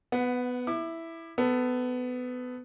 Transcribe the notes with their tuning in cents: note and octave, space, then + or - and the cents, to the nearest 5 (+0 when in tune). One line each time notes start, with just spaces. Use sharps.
B3 +10 F#5 -15
E4 +0 D6 +30
B3 +20 A4 +15